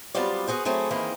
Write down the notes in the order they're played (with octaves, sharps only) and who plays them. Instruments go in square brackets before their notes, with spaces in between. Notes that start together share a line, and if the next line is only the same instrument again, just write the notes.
[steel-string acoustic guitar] F#3 G3 B3 C4 F4 D5
B3 F#4 G#4 C5
F#3 A3 C4 E4 G#4
D#3 E3 A#3 C4 E4 G#4